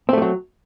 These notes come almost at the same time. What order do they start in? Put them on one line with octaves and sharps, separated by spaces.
C4 A3 G3 F#3